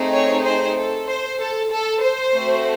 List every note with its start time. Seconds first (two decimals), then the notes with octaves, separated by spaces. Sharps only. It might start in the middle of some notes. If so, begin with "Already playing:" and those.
Already playing: A3 C4 D#4 G#4
0.12 C#5
0.44 C5
0.76 A4
1.07 C5
1.39 A4
1.72 A4
2.03 C5
2.35 A3 C4 F#4